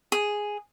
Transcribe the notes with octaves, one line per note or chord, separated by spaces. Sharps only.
G#4